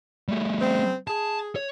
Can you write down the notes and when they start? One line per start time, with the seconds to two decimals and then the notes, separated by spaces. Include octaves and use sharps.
0.28 G3 A3
0.59 C#3 C4
1.08 G#4 A5
1.56 C#5